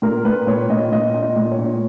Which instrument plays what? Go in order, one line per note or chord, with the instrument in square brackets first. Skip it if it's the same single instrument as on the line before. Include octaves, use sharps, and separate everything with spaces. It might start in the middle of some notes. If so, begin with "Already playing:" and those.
[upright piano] A#2 A#4
A#2 B4
A#2 C#5
A#2 D#5
A#2 D#5
A#2
D#5
A#2
C#5
A#2